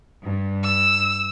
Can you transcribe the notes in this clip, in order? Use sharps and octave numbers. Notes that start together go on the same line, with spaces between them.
G2
E6